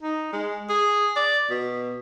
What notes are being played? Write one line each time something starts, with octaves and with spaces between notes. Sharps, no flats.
D#4
G#3
G#4
D5
B2